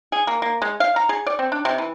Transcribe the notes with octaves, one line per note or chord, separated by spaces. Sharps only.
G#4
A#3
A#3
G#3
F5
A#5
G#4
D5
C4
D4
C3
E3